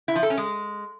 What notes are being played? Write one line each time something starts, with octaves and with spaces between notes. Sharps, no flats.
E4
F3
A4
C#4
G#3